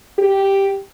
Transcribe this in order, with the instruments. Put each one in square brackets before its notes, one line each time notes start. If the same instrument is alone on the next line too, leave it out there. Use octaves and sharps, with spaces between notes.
[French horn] G4